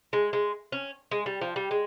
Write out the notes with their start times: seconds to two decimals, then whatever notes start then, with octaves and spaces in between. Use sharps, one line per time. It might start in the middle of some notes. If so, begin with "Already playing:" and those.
0.13 G#3
0.33 G#3
0.72 C#4
1.11 G#3
1.26 G3
1.41 F3
1.56 G3
1.71 G#3